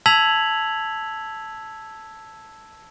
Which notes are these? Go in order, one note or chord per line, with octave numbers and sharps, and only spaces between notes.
A5 E6 G#6 B6 F7 F#7